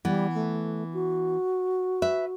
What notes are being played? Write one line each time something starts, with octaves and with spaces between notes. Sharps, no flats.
E3 G3 B3
A3
F#4
B4 E5